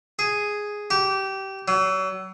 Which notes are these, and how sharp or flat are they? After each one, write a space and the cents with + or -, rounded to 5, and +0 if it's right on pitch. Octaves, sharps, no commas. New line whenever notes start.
G#4 +0
G4 -20
F#3 +35